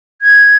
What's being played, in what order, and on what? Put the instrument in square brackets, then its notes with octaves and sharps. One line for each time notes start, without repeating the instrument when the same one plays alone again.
[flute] G#6